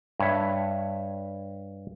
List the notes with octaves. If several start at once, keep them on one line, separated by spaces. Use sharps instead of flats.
G2 C#5 E5